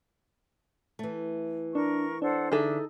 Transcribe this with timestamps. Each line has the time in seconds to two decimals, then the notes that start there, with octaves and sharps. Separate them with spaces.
0.99 E3 A3
1.75 D4 A#4 C#6
2.22 D4 A4 C5 F#5
2.52 D3 D4 D#4 G#4 A4 E5